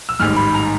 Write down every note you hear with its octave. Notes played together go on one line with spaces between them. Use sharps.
E6
A1 G#2 D#3 G3 F6
B5
A#5